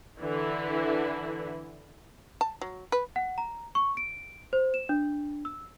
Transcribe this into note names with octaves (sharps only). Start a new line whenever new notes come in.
D3 E3 E4
A5
F#3
B4
F#5
A#5
C#6
D7
C5
E7
D4
E6